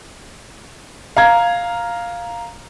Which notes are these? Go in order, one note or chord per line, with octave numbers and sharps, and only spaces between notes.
F5 A#5 G#6